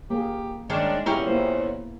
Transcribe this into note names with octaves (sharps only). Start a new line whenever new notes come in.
A#3 G4 G#4
D#3 G#3 C#4 D4
E2 A#2 C#4 E4 G4 G#4 A#4
A#3 B3 E4 C5